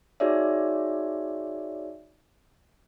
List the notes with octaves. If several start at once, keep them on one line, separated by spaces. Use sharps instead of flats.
D#4 F#4 G#4 C#5 D5 E5